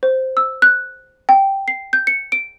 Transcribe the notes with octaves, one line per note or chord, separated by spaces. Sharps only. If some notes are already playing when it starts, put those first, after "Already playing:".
C5
E6
F#6
G5
C7
G6
C#7
D7